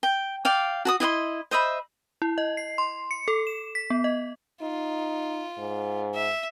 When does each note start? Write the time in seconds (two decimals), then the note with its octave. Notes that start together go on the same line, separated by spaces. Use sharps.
0.03 G5
0.45 D5 F5 G5
0.85 F#4 A5 D#6
1.00 E4 D#5 F#5 C6
1.51 C5 D#5 E5 B5
2.22 E4
2.38 D#5
2.57 C7
2.78 C6
3.11 C#7
3.28 A4
3.47 E7
3.75 B6
3.90 B3
4.04 D#5
4.62 D#4 F4
5.58 G#2
6.15 E5